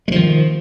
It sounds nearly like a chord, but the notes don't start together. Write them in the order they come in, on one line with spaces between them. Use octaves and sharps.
G#3 F3 D#3